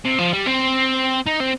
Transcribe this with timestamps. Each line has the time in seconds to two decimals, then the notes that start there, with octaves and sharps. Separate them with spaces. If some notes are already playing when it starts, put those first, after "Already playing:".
0.05 C3
0.18 F3
0.33 G3
0.46 C4
1.27 D#4
1.40 C4